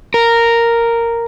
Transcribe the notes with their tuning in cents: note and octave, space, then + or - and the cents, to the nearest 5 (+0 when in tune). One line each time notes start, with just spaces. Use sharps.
A#4 -5